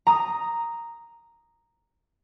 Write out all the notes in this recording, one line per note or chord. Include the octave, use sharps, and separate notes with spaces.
A#5 D#6